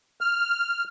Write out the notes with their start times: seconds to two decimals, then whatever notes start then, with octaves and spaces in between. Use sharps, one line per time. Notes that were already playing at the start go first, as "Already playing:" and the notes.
0.21 F6